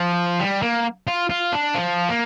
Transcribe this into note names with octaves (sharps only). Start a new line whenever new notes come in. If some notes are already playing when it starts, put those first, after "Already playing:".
Already playing: F3
G3
A#3
F4
F4
D4
F3
A#3